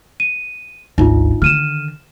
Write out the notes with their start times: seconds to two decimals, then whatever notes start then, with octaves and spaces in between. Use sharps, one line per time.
0.20 D#7
0.98 G#1 D2 D#4 F4
1.42 D3 D#3 F6 D#7 E7